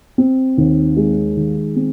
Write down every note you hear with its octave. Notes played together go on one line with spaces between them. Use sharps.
C4
D#2
G#3
D#3
C4